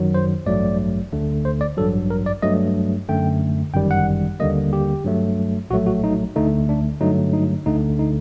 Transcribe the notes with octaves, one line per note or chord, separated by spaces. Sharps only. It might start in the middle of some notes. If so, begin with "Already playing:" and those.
Already playing: F#2 D#3 F#3
C5
A1 G2 F#3 A3 D5
D2 D3 A3
C5
D5
A1 G2 F#3 A4
A#4
D5
G2 F#3 A3 D#5
F#2 D3 A3 G5
G1 F#2 D#3 G3 G5
F#5
D#2 D3 G3 A#3 D#5
G4
G2 F#3 A3
A#1 A2 F#3 A3 F#4
F#4
D#4
D2 D3 A3 D#4
D4
G2 D3 F#3 A3 D#4
D#4
D2 D3 A3 D#4
D#4